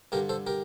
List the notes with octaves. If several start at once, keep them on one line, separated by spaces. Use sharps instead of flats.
G2 D3 G4 A#4
A4 C5
G4 A#4